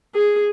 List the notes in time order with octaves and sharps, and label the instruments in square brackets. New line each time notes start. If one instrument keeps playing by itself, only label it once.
[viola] G#4